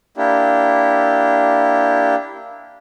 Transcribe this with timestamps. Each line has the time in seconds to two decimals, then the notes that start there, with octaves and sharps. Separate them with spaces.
0.17 A#3 D4 E4 G4